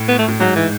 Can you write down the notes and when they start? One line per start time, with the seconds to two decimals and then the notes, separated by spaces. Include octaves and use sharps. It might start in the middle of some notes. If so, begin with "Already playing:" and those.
Already playing: A2
0.08 B3
0.19 A3
0.28 A2
0.40 G#2 F#3
0.56 E3